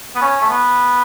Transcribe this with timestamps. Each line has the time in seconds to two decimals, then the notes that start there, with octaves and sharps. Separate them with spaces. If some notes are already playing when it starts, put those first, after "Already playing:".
0.15 B3
0.21 C#4
0.41 A3
0.49 B3